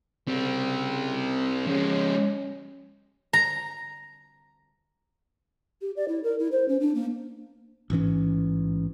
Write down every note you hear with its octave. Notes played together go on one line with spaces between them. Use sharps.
C#3 G3 C4
F3 G#3 C#4
A#5
G4
D5
E4
A#4
E4
C5
C#4
D4
A#3
A1 G#2 E3 C#4